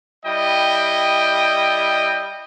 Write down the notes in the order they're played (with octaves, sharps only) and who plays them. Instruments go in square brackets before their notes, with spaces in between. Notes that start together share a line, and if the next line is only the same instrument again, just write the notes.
[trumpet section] G3 E4 D#5 G5